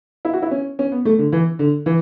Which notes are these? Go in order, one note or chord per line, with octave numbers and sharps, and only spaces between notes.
E4
F#4
E4
C#4
C#4
B3
A3
D3
E3
D3
E3